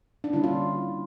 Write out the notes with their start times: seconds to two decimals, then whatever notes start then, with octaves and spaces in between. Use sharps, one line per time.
0.24 D4
0.33 D3 G3 A#3 C#4 E4
0.44 F4